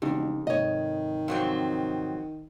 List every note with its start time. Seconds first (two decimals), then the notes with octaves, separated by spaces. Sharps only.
0.02 E1 F2 C#3 D#4 G4
0.47 G#2 C3 D#3 C#5 D#5
1.28 F2 F#3 C4